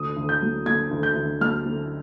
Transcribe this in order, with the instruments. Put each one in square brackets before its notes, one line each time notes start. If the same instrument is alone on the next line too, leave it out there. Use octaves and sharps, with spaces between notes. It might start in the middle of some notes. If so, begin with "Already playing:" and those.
Already playing: [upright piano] D2 D#6
D2
G6
F#3
D3 G#6
D2
G6
D2
F#3 F6
D3